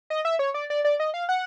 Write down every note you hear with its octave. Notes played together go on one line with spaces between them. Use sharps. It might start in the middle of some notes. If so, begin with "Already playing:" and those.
D#5
E5
C#5
D5
D5
D5
D#5
F5
F#5